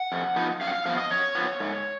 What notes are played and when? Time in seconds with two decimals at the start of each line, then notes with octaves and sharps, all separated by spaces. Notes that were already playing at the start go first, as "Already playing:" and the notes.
Already playing: F#5
0.12 F2
0.36 F3 B3 D#4
0.61 F#2 F5
0.67 F#5
0.73 F5
0.85 F3 B3 F5
0.98 D#5
1.11 F#2 C#5
1.35 F3 B3
1.60 G#2